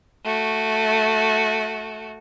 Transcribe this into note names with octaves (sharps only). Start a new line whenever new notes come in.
A3 F#4